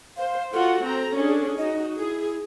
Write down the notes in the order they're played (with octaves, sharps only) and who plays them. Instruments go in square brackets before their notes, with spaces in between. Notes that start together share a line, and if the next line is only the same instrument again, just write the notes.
[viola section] C5 [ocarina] F5
[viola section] F4 F#4 F#5 [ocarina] A4
[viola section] C4 A#5
C#4 D4 G#4
[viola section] D#4 F#4 [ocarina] D#5
[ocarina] E4 [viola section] G#4